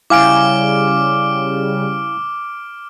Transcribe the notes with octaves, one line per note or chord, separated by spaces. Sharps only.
C#3 G3 E4 F5 G#5 D6 F6 D7